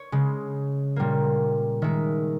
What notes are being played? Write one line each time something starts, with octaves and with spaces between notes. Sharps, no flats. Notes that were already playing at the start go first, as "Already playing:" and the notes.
Already playing: C#5
C#3 G#3
A#2 G3 A#3
D#3 G#3 E5